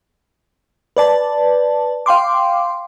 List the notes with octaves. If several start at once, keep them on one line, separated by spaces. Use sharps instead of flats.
B4 D5 A5
F5 G5 C6 D6